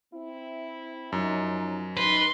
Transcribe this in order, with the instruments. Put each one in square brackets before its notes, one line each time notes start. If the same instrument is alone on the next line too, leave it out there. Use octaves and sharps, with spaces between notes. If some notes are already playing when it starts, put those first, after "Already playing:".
[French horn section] C4 E4
[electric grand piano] F#2 [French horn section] F3 C#4 D#4
[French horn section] D#4 [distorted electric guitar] B4 [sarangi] C6